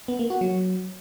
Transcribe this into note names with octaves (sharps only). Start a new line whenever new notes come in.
B3
A#3
F#4
F#3